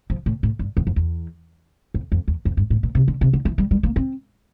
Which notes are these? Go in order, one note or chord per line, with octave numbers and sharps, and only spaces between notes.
F3
A2
A2
G2
E2
F2
E2
F2
F2
E2
F2
G2
A2
A#2
C3
D3
C3
D3
E3
G3
G3
A#3
C4